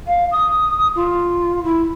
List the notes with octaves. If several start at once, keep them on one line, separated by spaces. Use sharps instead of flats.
F5
D#6
F4
E4